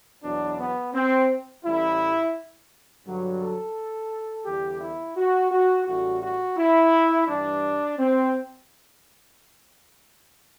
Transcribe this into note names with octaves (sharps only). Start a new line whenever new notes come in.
E2 B2 F#3 D4
B3
C4
A1 A2 G3 E4
G2 D3 F#3
A4
E2 D3 G3 G4
E4
F#4
F#4
A1 A2 G3 F#4
F#4
E4
G2 E3 G3 D4
C4